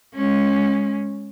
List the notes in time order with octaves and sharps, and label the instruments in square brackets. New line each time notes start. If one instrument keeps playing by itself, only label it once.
[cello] G#3 C#4